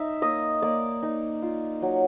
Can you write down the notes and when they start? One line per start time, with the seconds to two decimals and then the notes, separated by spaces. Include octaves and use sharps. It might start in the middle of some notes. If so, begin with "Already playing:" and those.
Already playing: D#4 E5
0.22 A#3 D#5
0.62 A#3 D5
1.03 D#4
1.43 F4
1.82 F#3